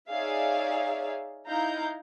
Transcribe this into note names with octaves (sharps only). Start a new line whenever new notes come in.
D#4 G#4 C#5 D5 E5 F5
D#4 E4 F5 A#5 G6